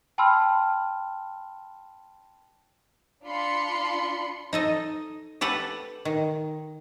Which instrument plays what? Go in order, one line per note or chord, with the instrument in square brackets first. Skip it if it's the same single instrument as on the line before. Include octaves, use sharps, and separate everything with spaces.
[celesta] G5 A5 B5 C6 E6 F6
[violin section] D4 F4 B5 C6 C#7
[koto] D#4 A4 D#5
G4 A4 B4 F#5
D#3